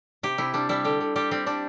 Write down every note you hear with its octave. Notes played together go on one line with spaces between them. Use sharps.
C3 G4
C3 E4
G3 D4
G3 E4
D3 G4
D3
G3 G4
G3 C4
G3 D4